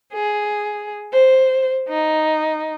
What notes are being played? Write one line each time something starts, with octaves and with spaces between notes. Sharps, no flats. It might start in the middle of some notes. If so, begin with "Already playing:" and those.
G#4
C5
D#4